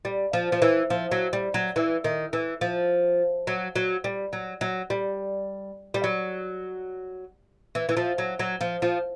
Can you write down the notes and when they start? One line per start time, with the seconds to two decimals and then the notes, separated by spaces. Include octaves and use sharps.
0.05 G3
0.33 F3
0.52 F3
0.62 E3
0.90 F3
1.11 F#3
1.33 G3
1.54 F#3
1.76 E3
2.04 D#3
2.33 E3
2.61 F3
3.47 F#3
3.76 F#3
4.04 G3
4.33 F#3
4.61 F#3
4.90 G3
5.94 G3
6.04 F#3
7.75 E3
7.89 E3
7.97 F3
8.18 F#3
8.39 F#3
8.61 F3
8.82 F3